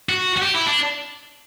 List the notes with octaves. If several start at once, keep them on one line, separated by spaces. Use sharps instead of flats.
F#4
F#4
G4
E4
D4